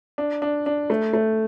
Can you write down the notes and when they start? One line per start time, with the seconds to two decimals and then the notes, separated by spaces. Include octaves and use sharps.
0.18 D4
0.42 D4
0.66 D4
0.90 A3
1.13 A3